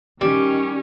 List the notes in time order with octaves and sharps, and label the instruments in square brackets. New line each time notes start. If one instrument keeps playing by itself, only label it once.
[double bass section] D#3 [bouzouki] G3 [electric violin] C#4